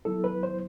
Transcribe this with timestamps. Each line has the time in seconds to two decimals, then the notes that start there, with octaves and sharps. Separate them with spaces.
0.05 F#3 B3 E4 A4
0.24 B4
0.43 C5